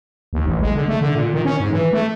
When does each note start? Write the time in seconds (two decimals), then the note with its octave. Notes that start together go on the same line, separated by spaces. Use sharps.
0.33 D#2
0.46 A1
0.61 G#3
0.75 D3
0.88 A3
1.01 D3
1.15 A#2
1.34 D#3
1.45 C#4
1.60 G#2
1.72 E3
1.93 A3